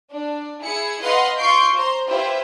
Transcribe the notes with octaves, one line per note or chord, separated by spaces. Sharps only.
D4
E4 G#4 C#7
B4 D#5 F5 F#5 C6
F4 C6 C#6 G6 C7 D7
C5 A#5 C6
E4 F4 G4 B4 C5 E5